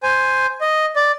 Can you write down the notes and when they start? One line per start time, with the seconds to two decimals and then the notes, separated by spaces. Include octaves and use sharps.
0.03 C5 G#5
0.61 D#5
0.96 D5